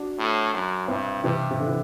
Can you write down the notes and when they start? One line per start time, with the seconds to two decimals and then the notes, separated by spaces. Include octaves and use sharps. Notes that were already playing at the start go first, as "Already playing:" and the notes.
Already playing: D4 F#4
0.19 A2
0.54 F#2
0.88 G2 C4 E4
1.24 G2 C3 E3
1.51 C3
1.59 D3
1.67 E3